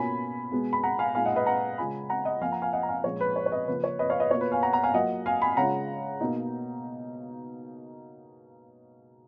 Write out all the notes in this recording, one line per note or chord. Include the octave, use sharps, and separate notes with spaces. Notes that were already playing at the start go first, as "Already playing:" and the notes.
Already playing: B2 A#3 C#4 F4 G#5 B5
B2 G#3 B3
B5
F#5 A#5
F5 G#5
A#2 G#3 D#4 F5 G#5
D#5 F#5
B4 D#5
F#5 A#5
C#3 G#3 C#4 F4 G#5 B5
F#5 A#5
D#5 F#5
F3 A#3 F4 F5 G#5
F#5 A#5
F5 G#5
D#5 F#5
A#5
F5 G#5
A#2 F3 G#3 C#4 C#5
B4
C#5
C#5
B4 D#5
C#3 F3 A#3 B4
C#5
B4 D#5
C#5 F5
B4 D#5
B2 A#3 F4 C#5
B4
F5 G#5
F#5 A#5
F#5 A#5
F5 G#5
F#3 A#3 F4 D#5 F#5
F5 G#5
G#5 B5
C#3 G#3 C#4 F4 F#5 A#5
B2 A#3 D#4